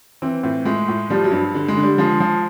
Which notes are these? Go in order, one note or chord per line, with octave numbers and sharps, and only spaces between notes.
E3 C4
A2 C4
A2 G#3
A2
F3 G3
F#3
G2
D3
G#3
D3
G3
F3 G#3
F3